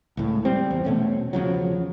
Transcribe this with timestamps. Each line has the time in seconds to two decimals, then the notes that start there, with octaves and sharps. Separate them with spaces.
0.17 C#2 A2
0.45 G3 C4
0.71 E2
0.85 B2 A3 C#4
1.33 E2 C#3 F3 F#3